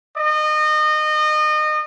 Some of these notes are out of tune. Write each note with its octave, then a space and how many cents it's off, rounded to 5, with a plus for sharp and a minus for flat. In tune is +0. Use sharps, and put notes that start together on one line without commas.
D#5 -30